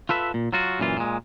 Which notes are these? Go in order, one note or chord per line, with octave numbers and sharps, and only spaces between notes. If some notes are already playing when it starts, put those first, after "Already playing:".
F4 A4 B4 E5
A#2
F#3 F4 F#4
F#2 A#2 E3 F4
A#2 G#3